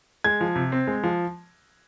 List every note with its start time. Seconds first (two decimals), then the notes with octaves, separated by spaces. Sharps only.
0.24 G#3 G#6
0.41 F3
0.56 C3
0.72 C4
0.88 G#3
1.03 F3